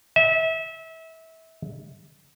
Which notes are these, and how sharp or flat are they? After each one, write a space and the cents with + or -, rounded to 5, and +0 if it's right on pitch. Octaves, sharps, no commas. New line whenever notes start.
E5 -30